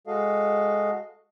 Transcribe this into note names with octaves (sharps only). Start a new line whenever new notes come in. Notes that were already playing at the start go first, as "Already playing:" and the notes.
G#3 F#4 A4 D#5 F5